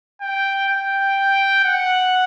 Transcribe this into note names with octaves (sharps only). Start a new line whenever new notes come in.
G5
G5
F#5